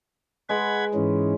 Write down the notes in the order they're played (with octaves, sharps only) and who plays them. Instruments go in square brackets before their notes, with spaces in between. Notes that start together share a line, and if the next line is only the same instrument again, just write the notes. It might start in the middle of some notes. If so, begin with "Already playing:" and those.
[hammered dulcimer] G#3 B4 D#5 [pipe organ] F#5 B5 G#6
[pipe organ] G#2 E3 C#4